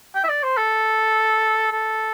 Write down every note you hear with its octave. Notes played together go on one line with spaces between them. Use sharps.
G5
E5
D5
C5
A4
A4